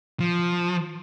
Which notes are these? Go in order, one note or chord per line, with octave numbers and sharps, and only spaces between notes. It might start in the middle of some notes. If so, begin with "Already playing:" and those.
F3